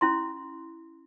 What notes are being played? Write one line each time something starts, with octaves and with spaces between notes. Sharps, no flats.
C#4 E4 C6